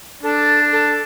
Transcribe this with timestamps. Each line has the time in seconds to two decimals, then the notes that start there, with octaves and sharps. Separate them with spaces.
0.23 D4 A4
0.72 A4